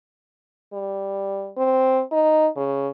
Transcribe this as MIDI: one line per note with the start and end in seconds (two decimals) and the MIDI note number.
0.73 1.50 55
1.57 2.02 60
2.12 2.47 63
2.56 2.88 49